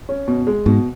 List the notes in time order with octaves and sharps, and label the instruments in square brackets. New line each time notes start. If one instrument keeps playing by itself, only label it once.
[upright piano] C#4
B2
G#3
[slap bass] G#2 [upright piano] B2